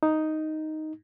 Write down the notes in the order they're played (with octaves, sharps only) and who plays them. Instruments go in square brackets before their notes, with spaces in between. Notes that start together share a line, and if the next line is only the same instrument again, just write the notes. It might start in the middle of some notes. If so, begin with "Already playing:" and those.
[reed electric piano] D#4